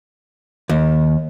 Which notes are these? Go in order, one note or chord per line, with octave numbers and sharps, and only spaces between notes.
D#2